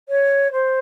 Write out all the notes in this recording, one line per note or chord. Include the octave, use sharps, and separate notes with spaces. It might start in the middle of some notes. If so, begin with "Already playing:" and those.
C#5
C5